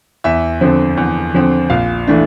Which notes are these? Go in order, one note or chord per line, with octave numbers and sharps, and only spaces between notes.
E2 E5
D3 F3 C4
E2
D3 F3 C4
A#1 F5
E3 A3 D4